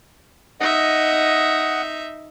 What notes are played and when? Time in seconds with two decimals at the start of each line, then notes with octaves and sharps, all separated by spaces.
0.60 D#4 D#5 E5 F#5